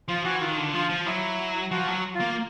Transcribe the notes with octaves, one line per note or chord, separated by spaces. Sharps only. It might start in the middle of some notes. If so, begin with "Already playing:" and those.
F3 F4
E3 F#4
D#3 F4
D3
F3 F4
F3
F#3 E4
F3 F#4
F#3
F4
A#3